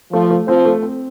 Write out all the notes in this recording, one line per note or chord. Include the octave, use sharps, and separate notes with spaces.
F3 A3
A3
F3 C4
A3
C4